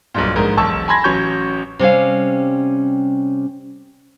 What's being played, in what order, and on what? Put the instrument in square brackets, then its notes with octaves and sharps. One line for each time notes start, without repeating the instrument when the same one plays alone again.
[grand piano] B1 G2 A#2
A#1 G#2 A#4
E1 B1 A5 C#6 E6
G#5 A5 B5 C6 G#6 A#6
A1 F#3 C#4 C#6 G6
[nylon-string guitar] C3 G3 C#4 F5